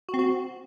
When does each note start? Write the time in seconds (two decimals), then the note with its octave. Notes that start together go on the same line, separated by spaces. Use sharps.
0.09 F#4
0.14 C4
0.19 F#4